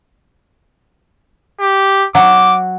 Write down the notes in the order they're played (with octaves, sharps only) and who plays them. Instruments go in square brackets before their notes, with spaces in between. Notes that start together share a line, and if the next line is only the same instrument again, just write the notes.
[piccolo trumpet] G4
[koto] F#3 [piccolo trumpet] D6